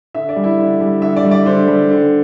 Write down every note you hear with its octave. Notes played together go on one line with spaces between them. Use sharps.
D3 E5
D5
G3
E4
D3
G3
D3 E5
D5
G3
D5
D3 C5
G3
D3